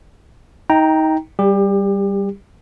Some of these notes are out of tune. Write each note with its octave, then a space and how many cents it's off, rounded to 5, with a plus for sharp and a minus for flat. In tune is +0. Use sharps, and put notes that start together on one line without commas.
D#4 +25 G5 +0 A#5 +0
G3 +0 G4 +30